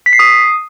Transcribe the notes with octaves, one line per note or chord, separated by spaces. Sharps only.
B6
C7
D#6